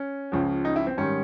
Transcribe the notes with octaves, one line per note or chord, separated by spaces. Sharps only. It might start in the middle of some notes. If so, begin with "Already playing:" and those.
Already playing: C#4
C#2 C#3 F3
D#4
E4
C4
G#2 D#3 G3 C#4